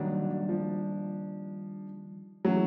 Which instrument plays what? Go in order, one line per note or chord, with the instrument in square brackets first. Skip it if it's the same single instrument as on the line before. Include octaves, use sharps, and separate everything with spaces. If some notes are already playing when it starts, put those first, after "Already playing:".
Already playing: [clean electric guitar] D#3 G3 A#3 D4 [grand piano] F#3
[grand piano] F3
[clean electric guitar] E3 A3 C#4 E4 G#4 [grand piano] F#3